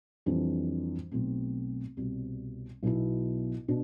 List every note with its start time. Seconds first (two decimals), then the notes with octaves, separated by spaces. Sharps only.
0.26 F2 E3 G3 D4
1.12 B1 B2 A3 C4
1.97 C2 B2 G3 C4
2.83 B1 B2 B3 E4
3.68 B2 D4